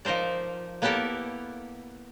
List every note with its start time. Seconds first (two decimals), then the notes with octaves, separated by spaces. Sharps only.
0.05 F3 D#4 A#4 C5 D5
0.82 A#3 B3 E4 G4 A4 A#4